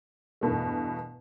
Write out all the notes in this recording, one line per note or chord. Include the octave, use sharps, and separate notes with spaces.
E2 G2 B2 A3